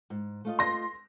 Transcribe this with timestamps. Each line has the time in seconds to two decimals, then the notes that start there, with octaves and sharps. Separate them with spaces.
0.10 G#2
0.45 A3 F4 D#5
0.59 C6 A#6